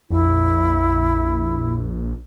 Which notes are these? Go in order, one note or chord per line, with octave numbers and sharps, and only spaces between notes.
A#1 F2 E4